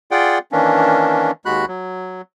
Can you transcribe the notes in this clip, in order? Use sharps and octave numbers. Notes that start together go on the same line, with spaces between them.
F4 G#4 D5 F#5 G5
D#3 E3 A#3 C#4 D4
D#2 G#3 F#4 B5 F#6
F#3